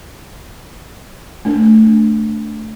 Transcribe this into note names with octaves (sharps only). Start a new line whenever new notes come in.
A3 D4